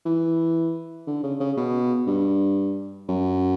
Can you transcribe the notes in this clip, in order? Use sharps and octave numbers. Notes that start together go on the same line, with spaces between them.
E3
D3
C#3
C#3
B2
G2
F#2